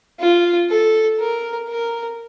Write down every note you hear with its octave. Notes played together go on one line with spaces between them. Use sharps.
F4
A4
A#4
A#4